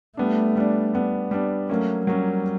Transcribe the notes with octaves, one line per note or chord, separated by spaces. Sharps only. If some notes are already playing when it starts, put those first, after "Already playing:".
G3 A3 B3 D4
G3 B3 D4
G3 B3 D4
G3 B3 D4
F#3 A3 A#3 C#4
F#3 G3 A#3 C#4